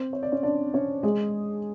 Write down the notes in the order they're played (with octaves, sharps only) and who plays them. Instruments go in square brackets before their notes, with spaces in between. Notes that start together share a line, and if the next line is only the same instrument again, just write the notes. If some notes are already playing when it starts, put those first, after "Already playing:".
Already playing: [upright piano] C4 C5
C#5
D5
C#4 C#5
D4 D5
C#4 C#5
G#3 G#4